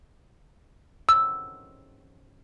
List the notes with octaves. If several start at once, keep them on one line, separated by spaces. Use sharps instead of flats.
E6